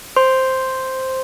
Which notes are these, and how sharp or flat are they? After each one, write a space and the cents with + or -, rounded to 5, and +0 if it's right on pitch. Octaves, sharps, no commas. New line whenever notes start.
C5 +0 C6 +0